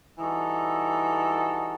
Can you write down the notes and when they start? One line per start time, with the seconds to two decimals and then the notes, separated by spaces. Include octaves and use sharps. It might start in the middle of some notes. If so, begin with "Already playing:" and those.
0.18 E3 G3 D#4 F#4 A4